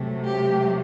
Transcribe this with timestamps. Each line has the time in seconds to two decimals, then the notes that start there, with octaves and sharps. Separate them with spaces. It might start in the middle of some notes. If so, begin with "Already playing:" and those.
Already playing: C3 F#3 A3
0.25 G4